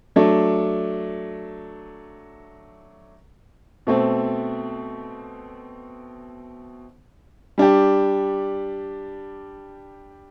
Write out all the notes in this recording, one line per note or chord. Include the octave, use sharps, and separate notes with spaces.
F#3 A3 D4
B2 A3 C4
G3 D4 G4